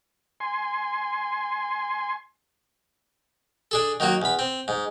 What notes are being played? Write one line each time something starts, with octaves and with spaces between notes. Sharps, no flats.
G#5 C6
D4 G#4 A4
D#3 F#3 A#3 F#4
E2 B5
C4
G#2